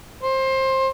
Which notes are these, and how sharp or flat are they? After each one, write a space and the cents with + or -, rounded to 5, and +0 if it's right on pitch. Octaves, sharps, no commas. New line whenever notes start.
C5 +20